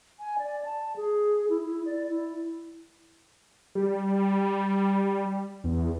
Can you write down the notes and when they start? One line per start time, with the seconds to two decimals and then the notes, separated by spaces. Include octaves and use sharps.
0.20 G#5
0.39 D5
0.65 A5
0.96 G#4
1.50 E4
1.63 E4
1.86 D5
2.09 E4
3.75 G3
5.64 E2